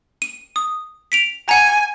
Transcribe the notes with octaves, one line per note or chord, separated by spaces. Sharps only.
D#7
D#6
B6 D7 F7
F#5 G#5 A#5